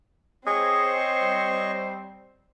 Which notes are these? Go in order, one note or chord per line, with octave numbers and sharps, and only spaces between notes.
C4 G#4 C5 C#5 D#5 C#6
G3